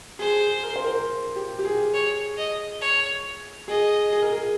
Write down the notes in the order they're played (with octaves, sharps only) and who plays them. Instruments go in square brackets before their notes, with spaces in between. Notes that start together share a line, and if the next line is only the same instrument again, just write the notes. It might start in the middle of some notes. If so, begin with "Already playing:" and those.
[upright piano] G#4 [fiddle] C5
[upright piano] G#4
A#4
C5
A#4
G4
G4
G#4
[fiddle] C#5
D#5
C#5
[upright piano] G#4 [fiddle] D#5
[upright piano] G#4
A#4
G#4